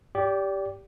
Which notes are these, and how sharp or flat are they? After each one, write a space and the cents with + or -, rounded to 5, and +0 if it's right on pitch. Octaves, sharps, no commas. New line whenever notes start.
G4 +0 D5 -30